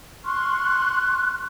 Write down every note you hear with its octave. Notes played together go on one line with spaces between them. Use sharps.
C6 C#6 F6 F#6